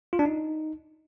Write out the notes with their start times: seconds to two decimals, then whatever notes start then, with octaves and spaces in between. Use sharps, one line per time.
0.13 F4
0.19 D4
0.25 D#4